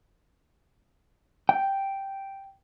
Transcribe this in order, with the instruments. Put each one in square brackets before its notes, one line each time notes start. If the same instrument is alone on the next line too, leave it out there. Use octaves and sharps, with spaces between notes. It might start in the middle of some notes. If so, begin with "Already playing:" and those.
[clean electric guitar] G5